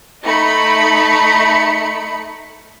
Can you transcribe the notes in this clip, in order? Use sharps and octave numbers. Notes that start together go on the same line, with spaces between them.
A3 D#4 B5 C#7